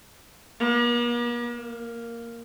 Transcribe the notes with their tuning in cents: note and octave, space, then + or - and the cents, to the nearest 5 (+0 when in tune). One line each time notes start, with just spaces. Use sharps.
A#3 +45
A#3 -5